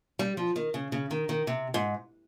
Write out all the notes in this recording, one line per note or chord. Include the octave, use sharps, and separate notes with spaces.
G3
F3
D#3
C#3
C#3
D#3
D#3
C3
G#2